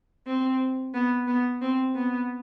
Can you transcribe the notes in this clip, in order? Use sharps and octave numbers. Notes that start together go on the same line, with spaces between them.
C4
B3
B3
C4
B3